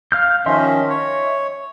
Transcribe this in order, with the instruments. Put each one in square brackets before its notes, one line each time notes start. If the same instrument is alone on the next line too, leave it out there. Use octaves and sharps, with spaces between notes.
[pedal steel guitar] F5 F6 G6
[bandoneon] D#3 F3 C#4 [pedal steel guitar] D#5 E5 C6
[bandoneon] C#5